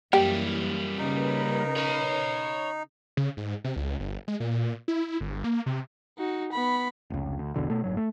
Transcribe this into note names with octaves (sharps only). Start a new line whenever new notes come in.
F#2 E3 G3 A#3 G4
C#3 D#4 A#4 B4
C#5 B5
C#3
G#2
C3
C#2
G1
G#3
A#2
E4
G1
A#3
C3
D#4 F#4
B3 B5
F1 C#2
D2
B1 E2 B2 D3
B2 A3
F#1 B1 G#2 F#3
A3